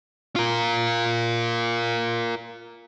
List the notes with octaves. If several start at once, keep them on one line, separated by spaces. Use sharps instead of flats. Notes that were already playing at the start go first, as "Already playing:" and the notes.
F4 A#4